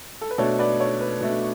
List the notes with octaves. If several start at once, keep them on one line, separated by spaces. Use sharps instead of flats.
A4
B4
B2 A3 D4 A4 C#5
B4 D5
A4 C#5
B4
B2 A3 D4